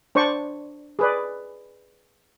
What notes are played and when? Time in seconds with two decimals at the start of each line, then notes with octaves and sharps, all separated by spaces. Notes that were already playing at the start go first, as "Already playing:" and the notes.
0.15 D4 C5 D5 C#6
0.99 G#4 B4 D5